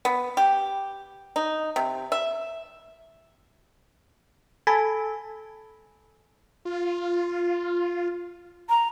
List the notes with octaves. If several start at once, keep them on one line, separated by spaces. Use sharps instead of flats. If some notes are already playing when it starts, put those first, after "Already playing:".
B3
G4
D#4
C3
E5
A4 G#5 A5 B5
F4
A#5